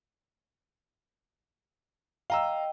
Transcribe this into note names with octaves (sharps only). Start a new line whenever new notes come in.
D#5 F5 G5 A#5 E6